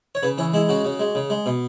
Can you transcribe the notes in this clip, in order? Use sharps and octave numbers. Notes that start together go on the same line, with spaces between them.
C#5
C#3 B4
E3 C#4
G#3 E4
C#3 F#4
C#3
G#3
C#3
G#3
B2